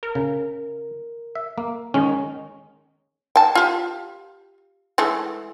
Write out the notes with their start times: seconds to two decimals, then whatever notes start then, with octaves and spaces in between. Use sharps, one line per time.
0.03 A#4
0.15 C#3
1.35 E5
1.58 A#3
1.94 D#3 G#3 C#4
3.36 G5 A5
3.55 F4 G4
4.98 E3 G#3 A3